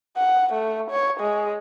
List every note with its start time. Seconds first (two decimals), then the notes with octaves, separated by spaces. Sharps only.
0.17 F#5
0.53 A3
0.91 C#5
1.20 G#3